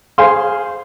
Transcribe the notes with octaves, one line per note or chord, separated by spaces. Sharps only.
G#4 C5 F5 C6